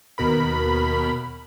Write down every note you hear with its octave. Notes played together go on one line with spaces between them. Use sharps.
D#2 B2 A#4 B5